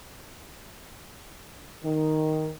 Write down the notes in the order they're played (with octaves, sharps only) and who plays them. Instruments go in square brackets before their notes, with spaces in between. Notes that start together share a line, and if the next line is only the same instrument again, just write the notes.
[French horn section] D#3